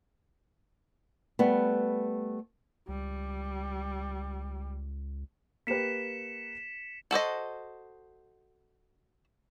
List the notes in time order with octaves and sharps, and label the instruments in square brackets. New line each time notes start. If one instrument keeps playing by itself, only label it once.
[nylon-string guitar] G3 A3 B3
[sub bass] C#2 [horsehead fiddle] G3
[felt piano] A#3 G4 B4 [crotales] B6 C#7 E7
[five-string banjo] F#4 A4 C5 D#5